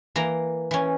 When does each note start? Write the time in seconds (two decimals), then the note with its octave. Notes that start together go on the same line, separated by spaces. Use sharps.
0.16 E3 A#3 A#5
0.71 E3 C#4